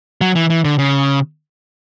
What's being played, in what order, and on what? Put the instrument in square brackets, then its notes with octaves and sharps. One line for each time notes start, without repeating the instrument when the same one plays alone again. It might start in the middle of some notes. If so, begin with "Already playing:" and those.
[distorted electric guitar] F#3
E3
E3
D3
C#3